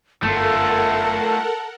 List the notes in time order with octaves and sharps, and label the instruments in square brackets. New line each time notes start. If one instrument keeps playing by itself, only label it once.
[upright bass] G1 F#2 [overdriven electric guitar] A3 F4 [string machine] A4 A#4 F#5 [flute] A5